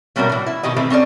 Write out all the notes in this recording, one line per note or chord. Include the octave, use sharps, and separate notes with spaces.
B2 G3 A3 C#4 F#4 A#4
A2 E3
E4
B2 D#3 G4 D#5
D#3 E3 A3 C4
C4 C#4 A4 D5